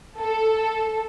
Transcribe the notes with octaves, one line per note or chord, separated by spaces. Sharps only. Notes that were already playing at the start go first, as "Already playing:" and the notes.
A4